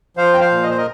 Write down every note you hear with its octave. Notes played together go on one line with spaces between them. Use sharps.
F3 C5 F5
G5
C5 F5
A#2
D#5
C5
A#4 D#5